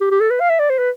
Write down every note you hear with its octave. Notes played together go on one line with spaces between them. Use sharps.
G4
G4
A4
B4
F5
E5
D5
C5
B4